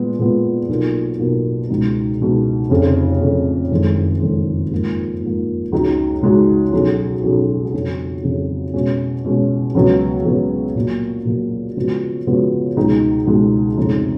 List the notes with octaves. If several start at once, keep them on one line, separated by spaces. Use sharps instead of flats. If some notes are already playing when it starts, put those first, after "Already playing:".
Already playing: A#2 G#3 B3 F4
A#2 G#3 B3 F4
B1 B2 A#3 F4 A#4
B1 B2 A#3 F4 A#4
C#2 B2 G#3 D#4
C#2 B2 G#3 D#4
F1 F2 C#3
F1 F2 C#3
F#1 F2 D#3 G#3
F#1 F2 D#3 G#3
G#2 F3 A#3
G#2 F3 A#3
C#2 C#3 G#3 D#4 F#4
C#2 C#3 G#3 D#4 F#4
B1 B2 F#3 C#4 G#4
B1 B2 F#3 C#4 G#4
F2 C#3 F#3
F2 C#3 F#3
B2 G#3 C#4
B2 G#3 C#4
C#2 C#3 F#3 B3
C#2 C#3 F#3 B3
A#2 F#3 A#3
A#2 F#3 A#3
C#3 F3 G#3 B3 F#4
C#3 F3 G#3 B3 F#4
C#2 B2 G#3 D#4
C#2 B2 G#3 D#4
F1 F2 C#3 G#3 D#4